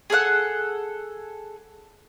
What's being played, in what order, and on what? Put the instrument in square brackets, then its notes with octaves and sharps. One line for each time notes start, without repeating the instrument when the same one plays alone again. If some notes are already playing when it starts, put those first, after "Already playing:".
[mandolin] G#4 A4 F5 F#5